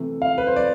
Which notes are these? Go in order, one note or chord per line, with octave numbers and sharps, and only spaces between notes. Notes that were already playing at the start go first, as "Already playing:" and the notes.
Already playing: C3 E3 A3
F5
B4
C5
D5